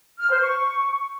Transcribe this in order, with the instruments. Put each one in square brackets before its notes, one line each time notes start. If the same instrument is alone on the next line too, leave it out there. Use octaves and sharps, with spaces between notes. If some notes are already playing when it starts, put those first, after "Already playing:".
[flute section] F6
C5
C#6